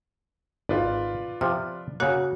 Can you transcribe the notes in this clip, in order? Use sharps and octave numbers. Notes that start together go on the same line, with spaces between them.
G#1 F4 B4 D5
C3 F3 F6
C#3 A#3 F#4 C#5 F#5